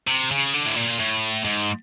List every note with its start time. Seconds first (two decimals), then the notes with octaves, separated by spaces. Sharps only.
0.08 C3
0.31 C#3
0.54 D3
0.65 A2
0.76 A#2
0.99 A2
1.45 G#2